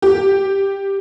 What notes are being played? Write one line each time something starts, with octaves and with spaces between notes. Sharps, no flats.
G4